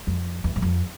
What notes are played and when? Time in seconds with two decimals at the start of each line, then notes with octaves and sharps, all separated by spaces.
0.07 F2
0.44 E2
0.56 F#2
0.62 F2